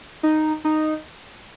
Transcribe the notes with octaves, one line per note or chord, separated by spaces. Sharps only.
D#4
D#4